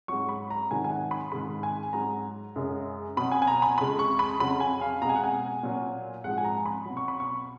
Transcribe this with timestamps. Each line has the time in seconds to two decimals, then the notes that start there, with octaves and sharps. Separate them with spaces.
0.08 G#2 F#3 C#6
0.29 B5
0.50 A#5
0.71 G#2 D#3 F#3 G#5
0.84 G#5
0.91 F#5
1.11 B5
1.32 G#2 D#3 G#3 B5
1.63 G#5
1.93 G#2 F#3 A#5
2.56 F#2 C#3 G#3
3.17 B2 F#3 B5
3.32 G#5
3.42 G#5
3.47 A#5
3.62 B5
3.78 F2 C#3 G#3 B5
3.99 C#6
4.19 B5
4.40 F2 C#3 F#3 B5
4.60 G#5
4.81 F5
5.02 B2 A#5
5.05 G#3 G#5
5.16 F#5
5.24 G#5
5.63 A#2 F#3
6.24 G#2 F3 G#3 F#5
6.38 G#5
6.45 A#5
6.66 B5
6.85 B2 F#3
6.97 C#6
7.08 B5
7.20 C#6